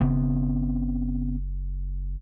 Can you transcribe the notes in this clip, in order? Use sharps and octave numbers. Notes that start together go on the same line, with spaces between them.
F#1 C#3 B3 C4